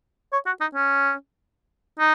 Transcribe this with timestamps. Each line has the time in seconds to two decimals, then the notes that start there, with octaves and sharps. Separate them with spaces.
0.33 C#5
0.46 F#4
0.61 D#4
0.75 C#4
1.99 D#4